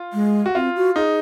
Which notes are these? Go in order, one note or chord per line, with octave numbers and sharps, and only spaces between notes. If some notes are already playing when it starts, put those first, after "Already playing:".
Already playing: F4
G#3
F#4
C4 F4
F#4
D#4 G#4